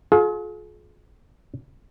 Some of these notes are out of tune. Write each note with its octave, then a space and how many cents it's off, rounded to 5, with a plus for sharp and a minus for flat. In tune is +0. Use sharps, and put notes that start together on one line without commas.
F4 +35 G#4 +40